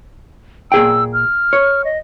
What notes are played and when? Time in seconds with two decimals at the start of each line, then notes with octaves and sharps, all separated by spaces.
0.72 A#2 G#4 G5 E6
1.13 F6
1.53 C#5
1.85 D#5